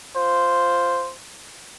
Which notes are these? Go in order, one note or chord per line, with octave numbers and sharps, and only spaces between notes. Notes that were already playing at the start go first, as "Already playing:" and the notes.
F4 C5